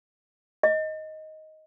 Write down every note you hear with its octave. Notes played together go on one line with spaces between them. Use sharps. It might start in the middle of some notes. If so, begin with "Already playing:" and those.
D#5